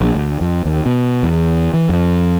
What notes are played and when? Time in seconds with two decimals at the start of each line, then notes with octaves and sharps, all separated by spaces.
0.01 A#1
0.15 D2
0.41 F2
0.65 D#2
0.86 B2
1.23 E2
1.74 E3
1.89 F2